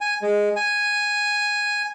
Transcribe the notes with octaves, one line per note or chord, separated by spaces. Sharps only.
G#5
G#3
G#5